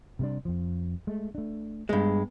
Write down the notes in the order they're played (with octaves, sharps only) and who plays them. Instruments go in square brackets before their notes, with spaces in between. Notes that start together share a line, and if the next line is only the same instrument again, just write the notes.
[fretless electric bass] C3 G3 D4
F2 F3
G#3 A3
A3 D4
[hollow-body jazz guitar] G2 G#3 [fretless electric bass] B3